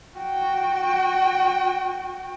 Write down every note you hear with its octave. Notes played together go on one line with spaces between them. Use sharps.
F#4 G5